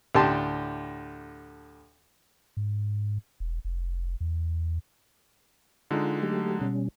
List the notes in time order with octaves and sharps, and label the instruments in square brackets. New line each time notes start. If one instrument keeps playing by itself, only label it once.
[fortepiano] D2 A2 G4 G5 A5 C6
[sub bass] G#2
E1
F1
E2
[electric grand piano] D3 G#3 D#4 [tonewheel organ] F4
[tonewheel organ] F#3 A3 G4
B2 G3 C#4